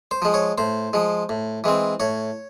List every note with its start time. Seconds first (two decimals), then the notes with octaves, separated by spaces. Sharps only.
0.11 C5
0.22 F3 G#3
0.34 C#5
0.58 A2 C5
0.93 F3 G#3
1.29 A2
1.64 E3 G#3 C4
2.00 A2 C#5